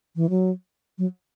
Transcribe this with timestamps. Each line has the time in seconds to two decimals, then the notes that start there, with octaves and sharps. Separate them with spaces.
0.16 E3
0.30 F#3
0.98 F#3